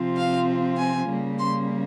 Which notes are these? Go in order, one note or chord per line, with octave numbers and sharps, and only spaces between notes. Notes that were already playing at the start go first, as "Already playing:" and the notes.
Already playing: C3 F3 C4 F4
F5
G#5
C#3 G3 A#3
C6